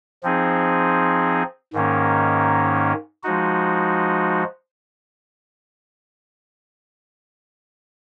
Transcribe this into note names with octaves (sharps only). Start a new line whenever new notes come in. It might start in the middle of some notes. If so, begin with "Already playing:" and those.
F3 C4 D#4 G#4
G#2 D#3 A#3 C#4
F3 G#3 D#4 F#4